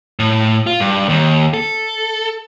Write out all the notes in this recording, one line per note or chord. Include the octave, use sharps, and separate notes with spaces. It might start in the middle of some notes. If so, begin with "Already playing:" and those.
A2
F4
G2
D#2
A4